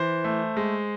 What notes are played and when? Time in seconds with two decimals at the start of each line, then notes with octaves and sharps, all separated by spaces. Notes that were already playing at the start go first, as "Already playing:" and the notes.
Already playing: E3 C5
0.24 A3
0.57 G#3